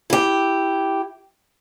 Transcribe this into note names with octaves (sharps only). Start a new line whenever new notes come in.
E4 G4